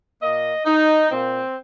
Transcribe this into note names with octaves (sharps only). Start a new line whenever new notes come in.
A#2 A#3 D#5
D#4
A#2 A#3 C4